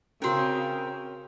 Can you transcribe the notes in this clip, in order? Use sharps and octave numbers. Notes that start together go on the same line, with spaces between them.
C#3 C4 C#4 F#4 A#4